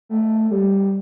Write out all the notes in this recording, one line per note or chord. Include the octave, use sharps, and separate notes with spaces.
A3
G3